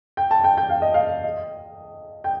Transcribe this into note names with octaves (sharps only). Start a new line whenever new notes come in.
G5
A5
G5
G5
F5
D#5
F5
D#5
G5